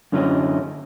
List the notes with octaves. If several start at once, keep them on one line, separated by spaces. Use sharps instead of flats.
F#2 D3 C#4 E4 F#4 D#5